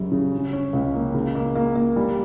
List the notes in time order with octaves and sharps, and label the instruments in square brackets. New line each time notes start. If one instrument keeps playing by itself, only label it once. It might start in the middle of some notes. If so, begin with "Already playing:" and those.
Already playing: [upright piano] F#2 C#3 G3
C#3
C#4
C#4
C#2
A#3
C#3
A#3
A#3
A#3
G3